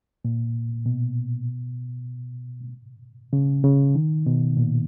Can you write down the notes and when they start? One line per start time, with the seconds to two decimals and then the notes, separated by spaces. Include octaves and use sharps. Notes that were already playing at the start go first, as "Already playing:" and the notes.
0.25 A#2
0.86 B2
3.33 C#3
3.64 C#3
3.95 D#3
4.26 B2
4.57 A#2